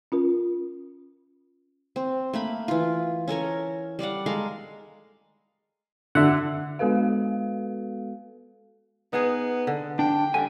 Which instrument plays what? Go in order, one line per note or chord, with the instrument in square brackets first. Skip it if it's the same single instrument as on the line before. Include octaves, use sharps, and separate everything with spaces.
[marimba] C#4 F4 A#4
[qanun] C4
A3 A#3 B5
E3 F4
C#4 A4 A#4 C#5
G3 D5 F5 F#5
G#3 A4 A#4 F5
[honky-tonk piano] D3 [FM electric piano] E5 F#5
[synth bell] G#3 B3 F#4 A4 B4 F5
[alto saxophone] B3 [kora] D#4 G#4
[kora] D3
[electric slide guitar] D4 [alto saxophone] G5
[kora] D3 G3 [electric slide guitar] G#5